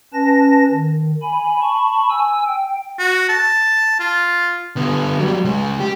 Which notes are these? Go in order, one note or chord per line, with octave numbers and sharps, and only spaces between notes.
C#4 B4 A5 A#6
D#3
G#5 B5
A5 B5 C#6
G#5 E6
G5
F#4
A5
F4
D3 B3
F#3 G3
C#2 G#3
G4